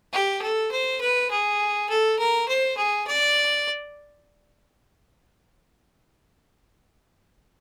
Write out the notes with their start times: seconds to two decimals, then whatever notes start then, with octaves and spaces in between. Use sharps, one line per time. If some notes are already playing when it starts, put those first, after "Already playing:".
0.13 G4
0.42 A4
0.71 C5
1.01 B4
1.31 G#4
1.89 A4
2.19 A#4
2.48 C5
2.77 G#4
3.07 D5